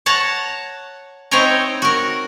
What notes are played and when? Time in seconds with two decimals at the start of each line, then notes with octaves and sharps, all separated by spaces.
0.06 C#5 F#5 A5 A#5
1.31 C4 D#4 E4 C#5 G5 A#5
1.82 F#4 A#4